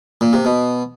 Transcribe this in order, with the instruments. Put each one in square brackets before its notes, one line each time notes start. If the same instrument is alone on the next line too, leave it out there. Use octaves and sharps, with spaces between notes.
[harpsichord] A#2
C3
B2